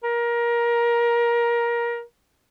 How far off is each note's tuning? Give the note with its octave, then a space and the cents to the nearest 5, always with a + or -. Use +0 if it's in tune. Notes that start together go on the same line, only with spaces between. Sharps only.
A#4 +20